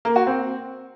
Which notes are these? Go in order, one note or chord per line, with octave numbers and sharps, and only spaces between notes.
A#3
F#4
C4